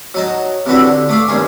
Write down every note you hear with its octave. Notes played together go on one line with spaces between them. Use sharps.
F#3 D#4 A5
C3 E3 D4 F#4 A4
D3
A3 D5 F5
B1 G2 D#3 G#4